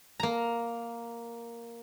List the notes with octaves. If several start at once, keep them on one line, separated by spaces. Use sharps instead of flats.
A#3 A#5